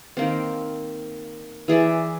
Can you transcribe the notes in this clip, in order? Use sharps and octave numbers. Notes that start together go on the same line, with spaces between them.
D#3 A#3 C4
E3 G#4 D5 E5